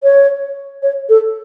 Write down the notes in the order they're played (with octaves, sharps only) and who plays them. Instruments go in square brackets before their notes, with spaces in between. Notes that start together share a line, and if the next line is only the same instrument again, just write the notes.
[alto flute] C#5
C#5
A4